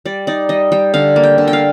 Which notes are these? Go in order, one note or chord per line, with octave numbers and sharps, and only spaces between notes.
G3 D5
D#4 D5
G3 D#5
G3 G5
D3 F5
A#3
G5
D3
G5
F5